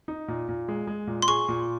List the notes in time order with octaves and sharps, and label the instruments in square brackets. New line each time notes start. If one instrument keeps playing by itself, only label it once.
[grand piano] D#4
A#2
A#2
G#3
G#3
A#2
[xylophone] C6
[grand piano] G#4 [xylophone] C#6
[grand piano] A#2